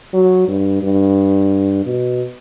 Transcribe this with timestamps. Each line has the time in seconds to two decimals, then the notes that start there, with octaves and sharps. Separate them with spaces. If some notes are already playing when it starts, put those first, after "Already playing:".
0.14 F#3
0.48 G2
0.83 G2
1.86 B2